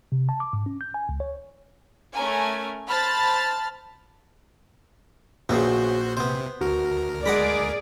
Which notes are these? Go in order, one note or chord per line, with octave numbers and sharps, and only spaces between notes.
C3
A5
D6
G#2
C#4
G6
G#5
C#2
C#5
A3 C#4 A#4 G#5
C5 A5 B5 F6 A6
A#1 C#3 F#3 B3 F#4 C5
C3 B3 C5
D2 F#4 A#4
G#3 G#4 D5 F#5 A#5 B5